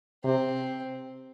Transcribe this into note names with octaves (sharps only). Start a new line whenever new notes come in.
C3 C4